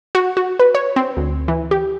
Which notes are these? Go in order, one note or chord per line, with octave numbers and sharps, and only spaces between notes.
F#4
F#4
B4
C#5
C4
D2
E3
G4